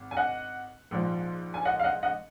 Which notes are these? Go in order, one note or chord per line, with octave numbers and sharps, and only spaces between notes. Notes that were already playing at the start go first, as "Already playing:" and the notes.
Already playing: G#1
G#5
D#5 F#5
A#1 G#2 F3
G#5
D#5 F#5
F5
D#5 F#5
D#5 F#5